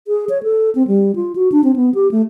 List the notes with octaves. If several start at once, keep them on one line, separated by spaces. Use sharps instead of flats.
G#4
C#5
A4
C4
G3
F4
F#4
D4
C4
B3
G4
A3